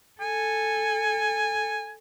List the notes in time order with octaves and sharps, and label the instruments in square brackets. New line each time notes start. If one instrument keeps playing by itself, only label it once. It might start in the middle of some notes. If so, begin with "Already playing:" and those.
[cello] A4 [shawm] G#5